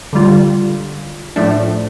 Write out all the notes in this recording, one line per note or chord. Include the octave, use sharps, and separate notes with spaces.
D3 G3 F4
A2 F3 A3 D4